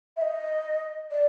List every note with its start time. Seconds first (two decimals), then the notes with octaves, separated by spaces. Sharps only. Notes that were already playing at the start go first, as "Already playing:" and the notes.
0.17 E5
0.21 D#5
1.11 D5